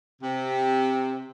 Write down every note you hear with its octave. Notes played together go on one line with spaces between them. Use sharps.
C3